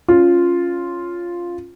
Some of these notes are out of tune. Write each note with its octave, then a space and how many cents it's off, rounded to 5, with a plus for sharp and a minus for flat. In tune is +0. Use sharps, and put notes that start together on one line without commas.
C#4 +0 F4 +0